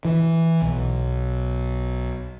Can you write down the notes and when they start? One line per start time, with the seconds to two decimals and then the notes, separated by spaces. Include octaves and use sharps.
0.05 E3
0.62 B1